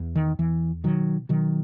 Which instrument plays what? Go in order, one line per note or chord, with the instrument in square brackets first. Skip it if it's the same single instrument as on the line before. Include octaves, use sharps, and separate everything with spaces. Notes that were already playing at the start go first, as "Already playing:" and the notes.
Already playing: [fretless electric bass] E2
D#3
E2 E3
B2 D#3 F#3
B2 D#3 F#3